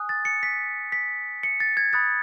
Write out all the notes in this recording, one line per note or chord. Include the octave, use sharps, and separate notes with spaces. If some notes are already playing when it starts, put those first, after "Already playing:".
Already playing: G#5 D#6 F#6
A6
C#7
B6
B6
C#7
A6
G#6
B5 D#6 F#6 A6